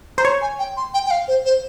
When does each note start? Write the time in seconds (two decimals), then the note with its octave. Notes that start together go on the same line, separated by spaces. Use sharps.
0.18 C5 A#5
0.24 C#5 C6
0.42 G#5
0.59 G5
0.77 C6
0.94 G5
1.06 G5
1.11 F5
1.28 C5
1.45 C5